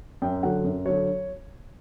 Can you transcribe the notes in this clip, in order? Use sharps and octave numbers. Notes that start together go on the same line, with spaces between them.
F#2 G5
D3 F#3 F#5
F#2
D3 F#3 C#5